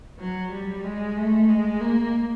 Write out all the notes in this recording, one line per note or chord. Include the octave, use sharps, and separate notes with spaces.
F#3
G3
G#3
A3
G#3
A#3